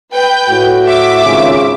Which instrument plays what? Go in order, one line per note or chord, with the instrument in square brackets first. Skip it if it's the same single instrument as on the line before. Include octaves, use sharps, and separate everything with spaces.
[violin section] B4 G5 G6
[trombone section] A2 [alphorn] F#4
[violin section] E5 D6
[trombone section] G#1 C#4 F4 [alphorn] C#3